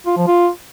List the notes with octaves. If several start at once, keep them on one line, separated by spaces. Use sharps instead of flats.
F4
F3
F4